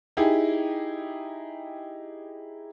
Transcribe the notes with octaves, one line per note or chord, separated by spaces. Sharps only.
D#4 E4 G4 G#4